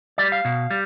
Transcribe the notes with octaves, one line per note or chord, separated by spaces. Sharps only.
G3 D5
F5
B2
G3